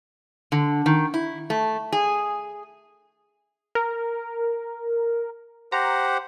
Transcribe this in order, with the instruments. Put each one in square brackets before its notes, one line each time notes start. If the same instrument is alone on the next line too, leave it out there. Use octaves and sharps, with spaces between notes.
[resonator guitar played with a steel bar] D3
D#3
E4
A3
G#4
[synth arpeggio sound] A#4
[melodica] G4 C5 F#5 [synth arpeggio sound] A#5